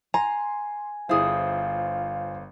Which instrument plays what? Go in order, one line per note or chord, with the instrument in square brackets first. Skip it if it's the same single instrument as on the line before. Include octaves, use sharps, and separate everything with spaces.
[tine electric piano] G#5 [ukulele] A#5 [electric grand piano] C6
[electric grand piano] G1 C5 [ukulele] E4 G#4 [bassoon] F4